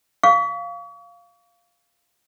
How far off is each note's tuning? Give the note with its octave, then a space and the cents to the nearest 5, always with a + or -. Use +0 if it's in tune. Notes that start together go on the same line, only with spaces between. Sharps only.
F5 +0 C#6 +40